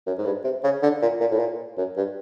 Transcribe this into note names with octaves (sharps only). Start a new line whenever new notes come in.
F#2
G#2
G2
C3
C#3
D3
A#2
A#2
A2
A#2
F#2
G2